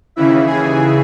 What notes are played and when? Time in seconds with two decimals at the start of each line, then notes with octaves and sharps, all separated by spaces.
0.16 D#2 C#3 E3 E4 E5
0.46 G#4 G#5